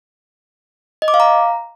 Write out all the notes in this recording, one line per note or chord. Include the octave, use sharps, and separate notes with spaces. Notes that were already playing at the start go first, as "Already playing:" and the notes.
D#5
D6
F5
A#5